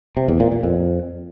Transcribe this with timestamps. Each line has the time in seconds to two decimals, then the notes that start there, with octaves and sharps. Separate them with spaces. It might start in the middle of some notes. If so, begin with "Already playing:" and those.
0.17 C3
0.28 E2
0.40 A#2
0.52 A#2
0.63 F2